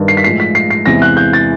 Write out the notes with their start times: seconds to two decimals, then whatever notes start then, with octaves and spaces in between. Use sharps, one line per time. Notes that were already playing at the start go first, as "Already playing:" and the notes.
Already playing: G2 D#3
0.08 C7
0.17 B6
0.24 A2 F3 G#3 C7
0.40 B6
0.55 C7
0.70 C7
0.86 E2 C3 E3 G#3 A#6
1.02 F#6
1.17 G6
1.33 A6